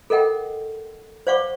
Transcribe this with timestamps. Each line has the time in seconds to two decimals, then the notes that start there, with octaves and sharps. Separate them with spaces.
0.10 A4 A#4 D#5 F#5 G5
1.27 C5 D5 F5 F#5 C#6 D6